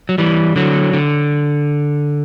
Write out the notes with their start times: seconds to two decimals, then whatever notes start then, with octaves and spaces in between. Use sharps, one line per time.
0.09 F#3
0.18 E3 G3
0.56 D3 F#3
0.93 D3